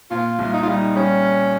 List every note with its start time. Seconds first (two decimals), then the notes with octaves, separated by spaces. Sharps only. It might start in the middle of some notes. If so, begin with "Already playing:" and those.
0.11 A#2 F4
0.39 C2
0.53 D#4
0.63 F4
0.67 G3 D#4
0.95 G3 C#4